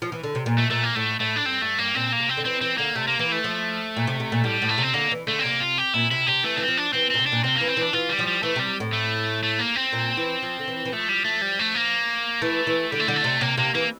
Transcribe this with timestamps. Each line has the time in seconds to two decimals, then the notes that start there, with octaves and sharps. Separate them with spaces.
0.02 F3
0.12 E3
0.23 D3
0.35 C3
0.46 A#2
0.58 A3
0.70 A#2 A3
0.83 A#3
0.95 A2 A3
1.20 A2 A3
1.36 D4
1.46 G2 C4
1.62 G2 A3
1.78 G2 A#3
1.95 A#2 C4
2.12 A#3
2.20 C3
2.29 C4
2.37 D3
2.45 E3 C4
2.61 E3 C4
2.78 D3 A#3
2.96 C3 A3
3.07 A#3
3.19 E3 A#3
3.32 A3
3.44 F3
3.97 A#2
4.07 C3
4.20 C3
4.32 A#2
4.44 A2 G3
4.62 A2
4.69 A3
4.78 C3 C4
4.94 D3 A#3
5.11 E3
5.27 D3 A3
5.39 C4
5.43 C3 A#3
5.60 F4
5.78 G4
5.94 A#2 E4
6.11 C3 E4
6.27 C3 G4
6.43 E3 A3
6.56 E3 C4 D4
6.68 F3
6.77 D4
6.93 E3 C4
7.10 A#2 C4
7.19 C3
7.26 D4
7.32 A#2
7.44 C3 C4
7.56 E3 A#3
7.68 C4
7.77 E3 D4
7.93 E3 F4
8.09 G3
8.19 F3
8.27 G3
8.43 E3 A3
8.56 C3 G3
8.80 A2
8.93 A3
9.43 A3
9.59 A#3
9.76 C4
9.93 A#2
10.17 E3
10.42 F3
10.59 D3
10.68 E3
10.85 E3
10.92 F3 A3
11.09 G3
11.25 A3
11.42 G3
11.59 A3
11.75 A#3
12.42 E3 A3
12.67 E3
12.91 D3 G3
12.99 A3
13.08 D3 G3
13.16 A3
13.24 C3
13.41 C3 A#3
13.57 C3 A#3
13.75 E3 A#3